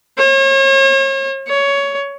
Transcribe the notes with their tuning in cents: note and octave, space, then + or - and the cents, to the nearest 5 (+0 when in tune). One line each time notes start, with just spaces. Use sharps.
C#5 -40
C#5 +15